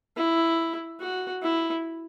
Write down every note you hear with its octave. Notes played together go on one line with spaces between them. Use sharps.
E4
F#4
E4